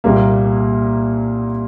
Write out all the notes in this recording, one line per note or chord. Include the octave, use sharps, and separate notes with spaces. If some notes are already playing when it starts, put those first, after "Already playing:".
C2 A#2 G3 A#3